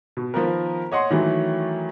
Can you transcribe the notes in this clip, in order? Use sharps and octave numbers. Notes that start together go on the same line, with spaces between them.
B2
D#3 F3 B3 A#4
C#5 D#5 F#5 C6
D#3 E3 F#3 A3